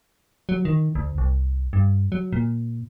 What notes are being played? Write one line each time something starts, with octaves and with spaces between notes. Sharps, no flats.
F#3
D#3
D2
C2
G2
F#3
A#2